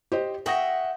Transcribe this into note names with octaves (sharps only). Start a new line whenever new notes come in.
G4 C5 D#5
E5 F#5 G5 C#6 D#6 A#6